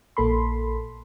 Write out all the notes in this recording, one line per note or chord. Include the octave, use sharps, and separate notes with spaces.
A#1 A#3 A4 B5 C6